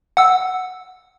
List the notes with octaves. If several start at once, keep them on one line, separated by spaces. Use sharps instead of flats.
F#5 E6